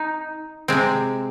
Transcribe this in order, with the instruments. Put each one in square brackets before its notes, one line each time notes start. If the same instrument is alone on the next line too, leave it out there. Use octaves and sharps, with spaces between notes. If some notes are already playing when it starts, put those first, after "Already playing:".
Already playing: [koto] D#4
C3 G#3 C4